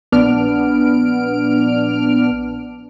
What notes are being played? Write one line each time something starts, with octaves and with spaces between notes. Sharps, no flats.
A#1 B3 D4 F6 D7